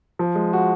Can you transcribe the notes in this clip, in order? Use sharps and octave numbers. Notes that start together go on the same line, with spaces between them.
F3
G#3
F#4